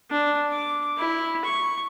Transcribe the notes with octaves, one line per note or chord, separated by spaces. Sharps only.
D4
D6
E4
C#6